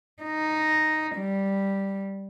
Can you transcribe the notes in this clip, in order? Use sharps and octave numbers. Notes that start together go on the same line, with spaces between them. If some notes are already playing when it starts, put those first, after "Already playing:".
D#4
G3